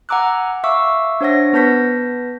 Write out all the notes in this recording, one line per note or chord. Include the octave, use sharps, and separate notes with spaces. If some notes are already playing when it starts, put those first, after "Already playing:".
F#5 G#5 A#5 D6 E6 F#6
E5 F5 C#6 D6 E6
D4 C5 C#5 F#5 A#6
B3 B4 A5 G6 A#6 B6